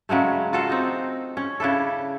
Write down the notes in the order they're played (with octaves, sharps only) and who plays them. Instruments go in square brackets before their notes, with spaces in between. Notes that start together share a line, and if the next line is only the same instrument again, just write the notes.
[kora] C#3 F#3 G#3 A3
F4 F#4 A4 F5
C4 D#4
C#4
C#3 D4 E4 A4